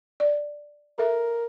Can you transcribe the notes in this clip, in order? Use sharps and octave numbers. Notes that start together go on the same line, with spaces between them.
D5
A4 A#4 E5